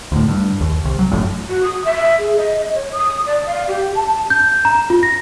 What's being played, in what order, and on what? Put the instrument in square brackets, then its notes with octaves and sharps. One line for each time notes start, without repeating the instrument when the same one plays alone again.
[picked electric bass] D2 A2
G2
D#2
C2
F#3
G#1 F#2 A2
[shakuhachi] F#4
D#6
E5
G#4
D#5
C#5
D#6
D5
F5
G4
A5
[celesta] G6
A#5
F4
A#6